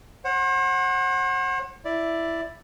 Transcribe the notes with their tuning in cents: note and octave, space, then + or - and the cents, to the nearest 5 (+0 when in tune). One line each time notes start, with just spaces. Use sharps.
C5 +45 F#5 +0
E4 +5 D5 +0